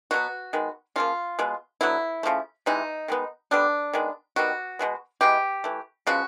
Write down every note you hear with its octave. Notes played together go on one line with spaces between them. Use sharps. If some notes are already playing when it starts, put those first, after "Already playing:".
B2 F#3 B3 F#4
D#3 G#3 B3
C#3 F3 A#3 F4
B2 G#3 B3
D3 F#3 B3 E4
C#3 F3 A3
C3 E3 G#3 D#4
D#3 G#3 B3
D3 G3 B3 D4
D#3 G#3 B3
D#3 G3 B3 F#4
B2 G#3 B3
E3 G#3 B3 G4
E3 A3
C#3 F3 G#3 B3 F#4